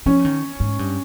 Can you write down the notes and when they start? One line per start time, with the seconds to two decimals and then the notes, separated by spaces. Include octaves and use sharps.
0.06 F3 C#4
0.25 D#3
0.60 G#2
0.79 G2